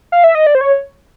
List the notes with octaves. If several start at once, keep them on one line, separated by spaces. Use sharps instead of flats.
F5
E5
D#5
D5
C5
C#5